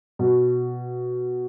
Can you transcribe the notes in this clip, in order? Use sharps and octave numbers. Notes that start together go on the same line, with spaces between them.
B2